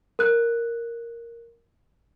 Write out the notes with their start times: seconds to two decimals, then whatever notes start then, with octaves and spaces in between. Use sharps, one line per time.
0.19 A#4 F#6